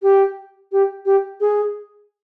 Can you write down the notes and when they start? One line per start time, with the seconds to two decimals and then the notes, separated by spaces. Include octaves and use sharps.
0.03 G4
0.72 G4
1.05 G4
1.41 G#4